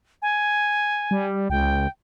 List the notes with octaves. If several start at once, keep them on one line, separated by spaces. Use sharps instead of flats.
G#5
G3
C#2 G5